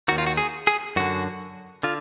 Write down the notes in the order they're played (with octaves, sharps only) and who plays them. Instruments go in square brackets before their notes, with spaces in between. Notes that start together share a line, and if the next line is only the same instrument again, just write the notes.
[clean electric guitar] D#2 D#3 F#4
F4
F#4
G#4
G#4
F#2 D3 F#4
D3 F4